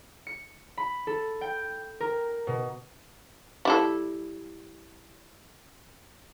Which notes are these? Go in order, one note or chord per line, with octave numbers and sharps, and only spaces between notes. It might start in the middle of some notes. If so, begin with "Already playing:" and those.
C#7
B5
A4
G5
A#4
B2
G3 E4 A4